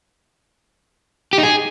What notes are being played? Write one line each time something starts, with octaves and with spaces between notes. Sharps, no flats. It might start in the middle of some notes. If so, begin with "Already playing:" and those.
G4
D#4
G#4